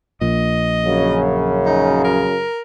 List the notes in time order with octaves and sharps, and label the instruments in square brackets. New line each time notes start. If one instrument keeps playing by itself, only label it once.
[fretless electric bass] A#1 A#2 [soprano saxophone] D#5
[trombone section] F#2 C#3
[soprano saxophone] D#4
A#4